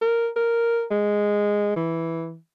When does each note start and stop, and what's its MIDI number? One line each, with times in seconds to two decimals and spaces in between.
0.01 0.29 70
0.36 0.84 70
0.91 1.75 56
1.76 2.36 52